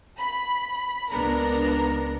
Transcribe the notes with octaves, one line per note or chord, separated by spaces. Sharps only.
B5
C#2 B3 D4 A#4 A#5